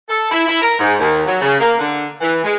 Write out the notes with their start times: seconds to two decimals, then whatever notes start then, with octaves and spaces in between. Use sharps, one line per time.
0.09 A4
0.30 E4
0.47 E4
0.60 A#4
0.79 G#2
0.99 D#2
1.26 F#3
1.41 C#3
1.60 A#3
1.79 D3
2.21 E3
2.44 G#3